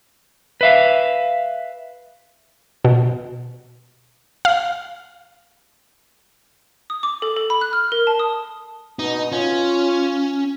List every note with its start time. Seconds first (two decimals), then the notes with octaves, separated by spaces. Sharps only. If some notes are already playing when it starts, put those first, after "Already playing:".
0.61 B4 E5 F5
2.84 B2
4.45 F5
6.90 D#6
7.03 D6
7.22 A4
7.36 A4
7.50 B5
7.61 F#6
7.73 F6
7.92 A#4
8.07 A5
8.19 D#6
8.99 B2 D#4
9.32 C#4 F4